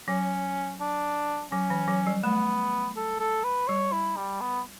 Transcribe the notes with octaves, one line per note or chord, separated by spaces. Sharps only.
F#3 C#4
D4
F#3 C#4
E3
F#3
G3
A3 B3
A4
A4
B4
G3 C#5
E4
G3
B3